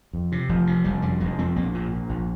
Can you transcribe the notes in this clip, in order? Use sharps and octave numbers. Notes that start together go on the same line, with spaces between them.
F2
C3
F1 F3
C3
F1 G3
F2 G3
F1 G#3
F2 C4
A#1 A#3
A#2
A#2
A#1